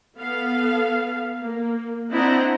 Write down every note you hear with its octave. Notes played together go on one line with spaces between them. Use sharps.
B3 A4 F5
A#3
C4 D4 E4 D#5 F#5 A#5